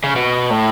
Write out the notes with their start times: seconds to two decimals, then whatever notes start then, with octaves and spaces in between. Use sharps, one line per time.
0.04 C#3
0.16 B2
0.51 A2